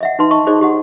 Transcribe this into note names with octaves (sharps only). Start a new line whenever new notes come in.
D#5 E5 F#5
D#4 B4 C6
D#5 A5 C#6
D#4 G#4 C5 D5 D#5
G4 D#5 F#5